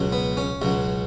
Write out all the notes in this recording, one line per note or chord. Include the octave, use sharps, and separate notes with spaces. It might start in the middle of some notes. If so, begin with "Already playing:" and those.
Already playing: C#2 B2 F#3
B3
C#4
C#2 B2 F#3